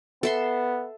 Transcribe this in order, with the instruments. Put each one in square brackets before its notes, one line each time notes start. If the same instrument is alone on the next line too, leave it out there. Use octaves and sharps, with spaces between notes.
[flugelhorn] B3 [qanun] A4 E5 C6